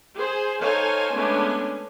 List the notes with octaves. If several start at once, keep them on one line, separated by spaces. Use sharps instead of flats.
G#4 C5
D#4 A4 C5 C#5 F5 G#5
G#3 A3 B3 C#4 D4 G#5